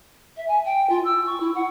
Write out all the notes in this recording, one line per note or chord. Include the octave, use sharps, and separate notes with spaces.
E5
G#5
G5
F4
E6
C#6
E4
F#5